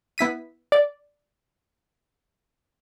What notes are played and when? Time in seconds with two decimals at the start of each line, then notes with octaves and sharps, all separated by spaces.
0.18 B3 E4 B6 D#7
0.72 D5